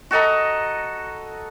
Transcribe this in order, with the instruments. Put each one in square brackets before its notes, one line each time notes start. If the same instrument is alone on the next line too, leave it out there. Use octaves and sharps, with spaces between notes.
[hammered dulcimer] F#4 A4 D#5 A#5